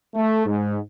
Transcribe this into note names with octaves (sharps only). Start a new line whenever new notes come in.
A3
G#2